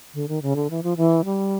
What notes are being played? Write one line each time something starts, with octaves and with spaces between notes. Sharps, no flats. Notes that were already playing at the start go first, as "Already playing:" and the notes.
D3
D#3
C#3
D3
E3
F3
E3
G3